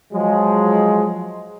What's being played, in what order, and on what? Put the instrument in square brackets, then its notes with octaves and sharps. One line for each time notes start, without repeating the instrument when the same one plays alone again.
[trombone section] F3 F#3 G#3